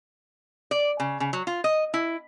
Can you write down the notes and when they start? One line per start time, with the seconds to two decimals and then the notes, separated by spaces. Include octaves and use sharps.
0.71 D5
1.00 C#3
1.20 C#3
1.33 F#3
1.47 F4
1.64 D#5
1.94 E4